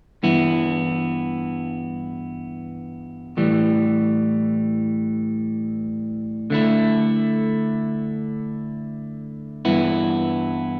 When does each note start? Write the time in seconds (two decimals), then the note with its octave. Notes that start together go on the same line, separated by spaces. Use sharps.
0.23 G2 E3 B3 E4
3.37 A2 E3 G3
6.50 D3 A3 E4
9.65 G2 E3 B3 E4